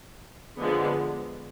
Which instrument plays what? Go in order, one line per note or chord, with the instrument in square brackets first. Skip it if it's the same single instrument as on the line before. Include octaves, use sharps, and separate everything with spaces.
[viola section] D3 F3 G#3 B3